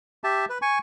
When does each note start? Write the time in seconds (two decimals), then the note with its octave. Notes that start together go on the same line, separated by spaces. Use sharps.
0.24 G4 E5 A5
0.49 B4
0.62 G#5 C#6